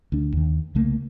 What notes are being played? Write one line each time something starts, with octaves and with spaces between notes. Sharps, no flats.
D2 D4
D#2 D#3
C2 C#3 A3 A#3